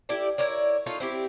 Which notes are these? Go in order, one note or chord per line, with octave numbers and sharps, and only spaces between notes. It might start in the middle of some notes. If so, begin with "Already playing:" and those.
E4 G4 A4 D5
E4 A#4 C#5 D5
D#4 F4 A4 C#5
C4 E4 G4